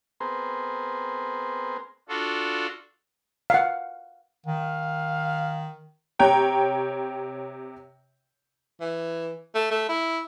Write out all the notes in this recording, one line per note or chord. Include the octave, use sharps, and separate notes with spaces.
B3 C4 G#4 A#4 C5
D4 F4 F#4 A4
F5 F#5
D#3 F5
C3 C#5 G5 A#5
E3
A3
A3
E4